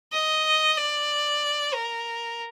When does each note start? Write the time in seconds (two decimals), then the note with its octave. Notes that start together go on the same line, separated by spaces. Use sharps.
0.13 D#5
0.77 D5
1.74 A#4